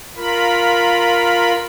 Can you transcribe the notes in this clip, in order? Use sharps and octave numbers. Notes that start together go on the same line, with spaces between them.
F4 A#4 B5